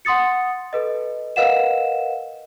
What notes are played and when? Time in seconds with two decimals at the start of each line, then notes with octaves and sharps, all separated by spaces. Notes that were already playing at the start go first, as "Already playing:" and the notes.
0.05 F#5 C6 D#6 A6 C#7
0.73 A4 B4 D#5
1.36 A#4 B4 D#5 F5 F#5 E7